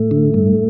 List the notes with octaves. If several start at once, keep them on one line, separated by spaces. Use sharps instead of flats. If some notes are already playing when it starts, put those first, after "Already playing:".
Already playing: A2 A3
D3
G2